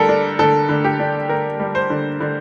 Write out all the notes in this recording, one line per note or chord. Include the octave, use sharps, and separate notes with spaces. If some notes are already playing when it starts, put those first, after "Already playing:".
Already playing: D3 G3 A4 A#4
D4
D3 A4
D3
G4
D4
D3 A#4
G3
C5
D3
D3